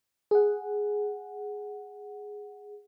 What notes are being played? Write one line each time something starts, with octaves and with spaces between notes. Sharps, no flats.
G#4 F#5